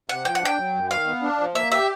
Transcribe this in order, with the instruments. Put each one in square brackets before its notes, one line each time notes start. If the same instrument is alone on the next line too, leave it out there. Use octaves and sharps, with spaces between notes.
[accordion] C3 [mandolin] F#5
[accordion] F3 [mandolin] G5
[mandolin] F#5
[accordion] D4 [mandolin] G5
[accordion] F#3
F#2
[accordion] D#3 [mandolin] F5
[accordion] B3
D4
F3
[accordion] A#3 [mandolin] E5
[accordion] G4 [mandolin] E5